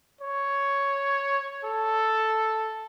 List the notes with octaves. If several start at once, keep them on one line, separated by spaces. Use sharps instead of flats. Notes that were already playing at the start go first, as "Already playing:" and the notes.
C#5
A4